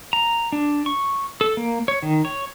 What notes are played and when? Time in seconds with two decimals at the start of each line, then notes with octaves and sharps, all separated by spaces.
0.13 A#5
0.52 D4
0.86 C#6
1.41 A4
1.57 A#3
1.88 C#5
2.03 D#3
2.25 C#5